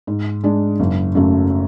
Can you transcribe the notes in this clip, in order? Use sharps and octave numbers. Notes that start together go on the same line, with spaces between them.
G#2
G#3 D4
F#1
F#2 C#3 F#3 A3